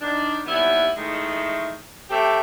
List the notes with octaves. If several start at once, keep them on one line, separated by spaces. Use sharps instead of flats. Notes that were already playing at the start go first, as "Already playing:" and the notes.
D#3 D4
D#2 F#3 G3 B3 E4
D#3 E3 G#3 A3
A3 C4 G4